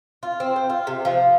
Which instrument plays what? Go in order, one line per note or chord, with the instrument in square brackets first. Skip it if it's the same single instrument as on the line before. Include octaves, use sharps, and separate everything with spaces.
[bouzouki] F4
C4
C5
F4
C3
F3